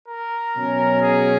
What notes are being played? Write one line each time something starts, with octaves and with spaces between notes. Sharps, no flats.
A#4
B2 F#3 C#4
G#4